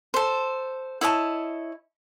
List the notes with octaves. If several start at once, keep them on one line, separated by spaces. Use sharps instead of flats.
A4 C5
E4 C#5 D#5 A5